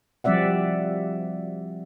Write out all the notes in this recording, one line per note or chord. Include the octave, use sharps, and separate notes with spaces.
F3 G3 C4 D5 E5 F#5